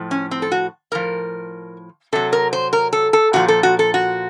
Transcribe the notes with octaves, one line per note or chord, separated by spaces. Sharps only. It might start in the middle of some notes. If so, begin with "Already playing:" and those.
Already playing: A2 F3
C#4
C4
A4
F#4
A2 F3 A#4
C3 F#3 A4
A#4
C5
A#4
A4
A4
A#2 F3 F#4
A4
F#4
A4
F#4